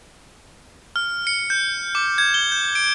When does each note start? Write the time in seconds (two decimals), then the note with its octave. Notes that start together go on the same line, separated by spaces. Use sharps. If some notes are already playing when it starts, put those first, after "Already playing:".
0.96 F6
1.27 C#7
1.50 G6
1.95 D6
2.18 G#6
2.34 G7
2.52 G6
2.75 D7